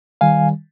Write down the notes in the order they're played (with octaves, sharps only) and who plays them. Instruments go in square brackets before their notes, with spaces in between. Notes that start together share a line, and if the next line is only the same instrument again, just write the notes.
[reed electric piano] D#3 G3 F5 G#5